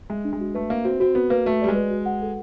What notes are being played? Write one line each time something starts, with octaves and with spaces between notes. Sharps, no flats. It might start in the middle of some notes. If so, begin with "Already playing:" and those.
G#3 E5
D4
G#3
F#4
A3 B4
A#3 E5
C4 F#4
C4 F#4
B3 F#4
A#3 B4
A3 F#4
G3 D5
G#3
B4
F#4
F#5
A4